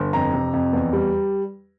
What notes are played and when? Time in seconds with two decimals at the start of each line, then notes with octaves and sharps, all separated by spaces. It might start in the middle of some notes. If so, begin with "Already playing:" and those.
Already playing: G1
0.13 F2 A#5
0.33 C3
0.53 F2
0.73 E2
0.93 G3